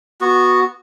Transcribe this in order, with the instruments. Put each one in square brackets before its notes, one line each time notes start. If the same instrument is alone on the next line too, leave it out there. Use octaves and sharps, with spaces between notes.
[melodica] B3 F#4